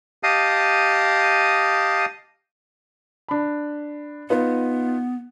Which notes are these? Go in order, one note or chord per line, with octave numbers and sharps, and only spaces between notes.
G4 D#5 F5 A5 D#6
D4 B5
B3 D#4 F4 B4